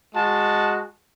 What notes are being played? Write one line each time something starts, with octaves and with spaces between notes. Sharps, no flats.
G#3 F#4 A5